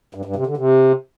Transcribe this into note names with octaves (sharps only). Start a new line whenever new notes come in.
G2
G2
C3
D3
C3